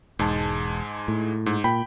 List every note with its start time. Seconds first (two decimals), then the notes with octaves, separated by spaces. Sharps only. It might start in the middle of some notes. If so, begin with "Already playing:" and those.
0.19 E1 G#2 G#3 A5
1.08 A2
1.46 G#2
1.64 A#2 G5 B5